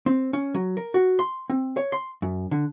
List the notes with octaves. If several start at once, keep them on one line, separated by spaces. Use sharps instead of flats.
C4
C#4
F#3
A#4
F#4
C6
C4
C#5
C6
F#2
D3